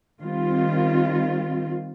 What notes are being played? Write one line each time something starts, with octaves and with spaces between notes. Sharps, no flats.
D#3 G3 C4 F4